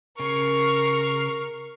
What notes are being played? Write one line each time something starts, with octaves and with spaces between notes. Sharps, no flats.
C#3 A#4 C#6 F6 C7